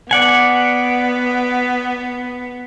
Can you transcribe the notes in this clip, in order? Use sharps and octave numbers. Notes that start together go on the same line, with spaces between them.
B3 D5 F#5 G#5